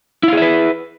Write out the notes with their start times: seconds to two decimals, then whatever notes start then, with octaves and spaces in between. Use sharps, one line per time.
0.23 E4
0.28 F5
0.33 G#4
0.37 E5
0.42 B4